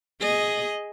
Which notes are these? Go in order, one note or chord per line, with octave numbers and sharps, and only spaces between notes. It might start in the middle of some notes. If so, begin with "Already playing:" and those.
G#4 D#5